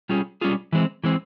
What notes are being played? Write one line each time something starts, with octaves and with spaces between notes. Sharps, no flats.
G3 C#4 F4 G#4
G3 C#4 F4 G#4
E3 G#3 C4
E3 G#3 C4